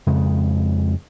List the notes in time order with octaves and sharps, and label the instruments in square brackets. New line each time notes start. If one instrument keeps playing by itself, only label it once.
[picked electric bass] F2 C#3 G#3